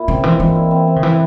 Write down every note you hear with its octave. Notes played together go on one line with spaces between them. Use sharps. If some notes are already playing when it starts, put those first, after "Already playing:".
Already playing: A#2 E4
C#3 C4
E3 G#3
A#2 E3
E4
C4
C4
C#3
E3